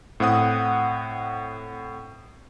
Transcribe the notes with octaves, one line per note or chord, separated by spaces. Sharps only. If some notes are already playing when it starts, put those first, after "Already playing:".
A2 C4 F#5 D#6